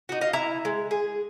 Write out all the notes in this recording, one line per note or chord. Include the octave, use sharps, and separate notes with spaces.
D#4 F#4
D#5 F5
E4 A#5
G#3
G#4